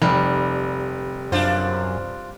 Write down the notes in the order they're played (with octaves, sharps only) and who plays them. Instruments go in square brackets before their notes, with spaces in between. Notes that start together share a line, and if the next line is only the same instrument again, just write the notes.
[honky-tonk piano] F1 [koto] G3
[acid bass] F#2 [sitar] D4 F4 C5